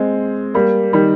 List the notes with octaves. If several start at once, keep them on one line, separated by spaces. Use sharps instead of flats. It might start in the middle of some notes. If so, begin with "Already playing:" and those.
Already playing: G#3 C4
G3 A#3
D#3 G3